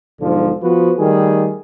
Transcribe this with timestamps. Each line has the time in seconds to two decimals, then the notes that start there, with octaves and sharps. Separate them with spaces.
0.21 B1 G#2 D3 F3
0.62 F3 B3 F#4 B4
0.98 D#3 G3 A3 G#4